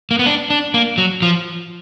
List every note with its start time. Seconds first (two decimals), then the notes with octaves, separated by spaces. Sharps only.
0.11 A#3
0.19 B3
0.26 D4
0.50 D4
0.74 A#3
0.98 F#3
1.22 F3